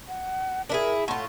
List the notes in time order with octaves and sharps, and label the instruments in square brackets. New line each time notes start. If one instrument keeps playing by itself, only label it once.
[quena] F#5
[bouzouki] D4 E4 G#4 [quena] A#4
[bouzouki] A2 F4 [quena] F#5